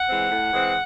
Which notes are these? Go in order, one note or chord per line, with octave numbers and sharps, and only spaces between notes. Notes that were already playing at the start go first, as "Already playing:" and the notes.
Already playing: F#5
E3 G#3 C4
A2
E3 G#3 C4